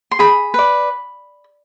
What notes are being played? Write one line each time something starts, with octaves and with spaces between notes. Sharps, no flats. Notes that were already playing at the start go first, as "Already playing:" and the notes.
C6
G#4 B5
B4 D5